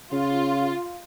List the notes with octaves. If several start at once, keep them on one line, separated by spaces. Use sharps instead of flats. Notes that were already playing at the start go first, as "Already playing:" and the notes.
C#3 F4